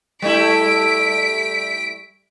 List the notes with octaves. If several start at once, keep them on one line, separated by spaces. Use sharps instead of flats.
G3 A3 E4 B6 D7